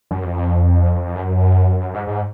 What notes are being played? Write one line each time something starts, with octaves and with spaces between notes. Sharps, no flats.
F#2
F2
F#2
G#2
G#2